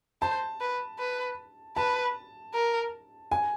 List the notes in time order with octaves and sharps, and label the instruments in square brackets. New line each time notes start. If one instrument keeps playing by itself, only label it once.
[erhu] C5 [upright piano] A5
[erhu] B4
B4
[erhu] B4 [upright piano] A5
[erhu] A#4
[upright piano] G#5